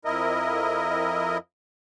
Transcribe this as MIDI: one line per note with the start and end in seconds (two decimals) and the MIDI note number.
0.05 1.38 41
0.05 1.38 64
0.05 1.38 70
0.05 1.38 75